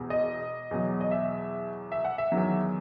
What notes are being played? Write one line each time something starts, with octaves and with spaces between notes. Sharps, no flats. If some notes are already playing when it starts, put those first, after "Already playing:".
Already playing: E1 E2
D#5
E2 B2 F#3
D#5
E5
E5
F#5
E5
E2 D#3 F#3